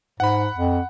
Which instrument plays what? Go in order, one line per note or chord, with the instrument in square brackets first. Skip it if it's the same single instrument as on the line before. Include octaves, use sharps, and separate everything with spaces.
[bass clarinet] G#2 [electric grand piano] F#5 B5
[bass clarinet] F2